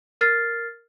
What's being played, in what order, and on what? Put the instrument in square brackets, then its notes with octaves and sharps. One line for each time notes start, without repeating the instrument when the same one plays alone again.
[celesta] A#4 F6 A6 C7